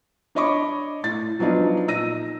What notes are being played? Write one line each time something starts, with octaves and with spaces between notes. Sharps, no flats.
D4 C#5 D#5 B5 C#6 D6
A2 A6
F3 F#3 B3 D4 D#4 F4
A#2 D#4 E6 A#6 D#7